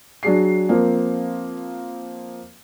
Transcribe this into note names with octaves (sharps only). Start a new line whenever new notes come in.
F#3 D4 G#4 C7
F3 A#3 C4